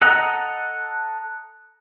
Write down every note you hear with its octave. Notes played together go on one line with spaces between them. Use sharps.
A4 D#5 F#5 A5 A#5